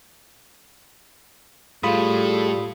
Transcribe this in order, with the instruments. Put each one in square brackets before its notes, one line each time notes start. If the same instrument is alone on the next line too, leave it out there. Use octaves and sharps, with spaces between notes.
[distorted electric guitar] A2 [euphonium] G3 [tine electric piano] F4 B5 D#6 [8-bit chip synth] G#4 A4 F5